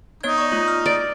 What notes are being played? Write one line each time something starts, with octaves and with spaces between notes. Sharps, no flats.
B3 D#4 C#5 G#6
D5 C#6
A3 F4
F6
D5